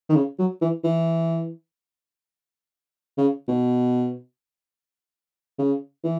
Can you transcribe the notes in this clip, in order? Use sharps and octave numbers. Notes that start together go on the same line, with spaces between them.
D#3
C#3
F#3
E3
E3
C#3
B2
C#3
E3